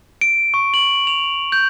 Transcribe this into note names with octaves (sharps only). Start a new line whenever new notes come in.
D7
C#6
F#7
F7
G6